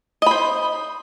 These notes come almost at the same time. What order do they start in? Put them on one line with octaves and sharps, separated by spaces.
D#5 B5 C5